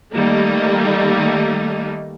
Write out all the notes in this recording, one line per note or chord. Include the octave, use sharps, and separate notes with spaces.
D#3 G3 A3 A#3 D#4